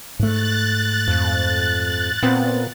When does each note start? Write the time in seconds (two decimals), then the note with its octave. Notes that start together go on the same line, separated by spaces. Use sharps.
0.19 G#2 A3 F#6 A6
1.08 F2
2.23 A#2 B3 C4